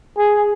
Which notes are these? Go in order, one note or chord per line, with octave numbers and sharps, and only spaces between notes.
G#4